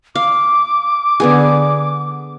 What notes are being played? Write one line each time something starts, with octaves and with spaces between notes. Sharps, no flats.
F5 D6
D3 B3 G#4